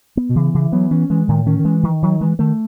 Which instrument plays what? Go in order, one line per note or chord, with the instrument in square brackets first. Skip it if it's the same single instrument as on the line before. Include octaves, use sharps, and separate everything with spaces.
[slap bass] B3
[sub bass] B2
[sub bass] C#3 [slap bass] E3
[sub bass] C#3 [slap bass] E3
[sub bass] F#3 [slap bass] B3
[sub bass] E3 [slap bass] C#4
[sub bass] E3 [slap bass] G#3
[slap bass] A2 [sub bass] D#3
[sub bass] D#3 [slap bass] C#4
[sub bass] D#3
[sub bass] E3 [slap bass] G#3
[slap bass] D#3
[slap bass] D#3 [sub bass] F#3
[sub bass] E3 [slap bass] G#3
[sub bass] D#3 [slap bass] A3